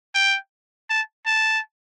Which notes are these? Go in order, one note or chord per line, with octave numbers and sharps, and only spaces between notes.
G5
A5
A5